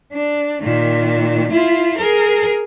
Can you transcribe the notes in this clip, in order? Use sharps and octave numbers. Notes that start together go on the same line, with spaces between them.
D4
A#2 D#3
E4 F4
G#4 A#4